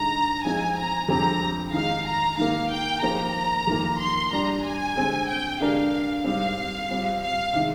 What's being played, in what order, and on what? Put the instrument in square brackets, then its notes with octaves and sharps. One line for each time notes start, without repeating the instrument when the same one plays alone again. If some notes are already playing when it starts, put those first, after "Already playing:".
Already playing: [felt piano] G2 D3 G#3 D#4 [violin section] A#5
[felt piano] F3 G#3 C4 D#4 G#4 [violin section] G#5
[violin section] A#5
[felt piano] F2 D3 G#3 C4 G4 [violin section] A#5
[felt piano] D#3 G#3 D#4 [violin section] F5
[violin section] A#5
[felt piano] G#2 D#3 A#3 [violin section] F5
[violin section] G5
[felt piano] F3 A#3 D#4 G#4 C5 [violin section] A#5
[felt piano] F2 D#3 A#3
[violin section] C6
[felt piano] G3 D4 G4 [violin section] A#5
[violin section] G#5
[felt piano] D3 G#3 C4
[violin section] G5
[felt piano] D3 G#3 D4 G4 A#4 [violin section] F5
[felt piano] G#2 G3 C4 [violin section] F5
[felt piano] G3 C4 F4
[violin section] F5
[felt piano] C3 D#3 G#3